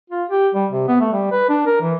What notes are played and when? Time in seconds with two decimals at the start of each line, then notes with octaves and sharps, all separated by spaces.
0.10 F4
0.29 G4
0.54 G3
0.71 C3
0.88 B3
1.00 A3
1.12 G3
1.32 B4
1.49 D4
1.66 A#4
1.82 E3